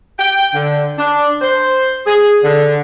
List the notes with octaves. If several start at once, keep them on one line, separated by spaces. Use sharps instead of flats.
G5
D3
D4
C5
G#4
D3